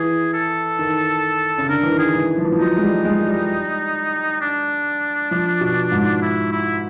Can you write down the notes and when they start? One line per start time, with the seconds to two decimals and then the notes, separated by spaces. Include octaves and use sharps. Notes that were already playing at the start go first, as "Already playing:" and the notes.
Already playing: E3 G#4
0.34 A4
0.79 D#3
1.58 C#3
1.69 D3 A#4
1.83 E3
1.92 D#3
1.99 G#4
2.15 E3
2.38 F3
2.45 E3
2.52 F3
2.59 F#3 D#4
2.78 G#3
2.82 G3
3.05 G#3
3.27 G3
4.41 D4
5.31 F3
5.61 B2
5.92 G#2
6.22 E4
6.52 E4